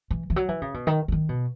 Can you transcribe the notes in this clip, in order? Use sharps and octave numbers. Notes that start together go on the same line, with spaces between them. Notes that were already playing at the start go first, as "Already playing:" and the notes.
E3
E3
F#3
E3
C#3
B2
D#3
C#3
D#3
B2